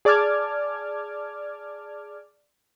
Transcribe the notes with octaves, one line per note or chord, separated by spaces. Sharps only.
G#4 D5 A5 D6 F6 G#6